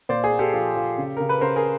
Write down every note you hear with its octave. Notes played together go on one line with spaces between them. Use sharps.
A#2 C5 D5
G#4
A#3
G4 A4
F3
F3
C#3
C#3 A#4
B4
C#3 A#4 C5
G#4 A#4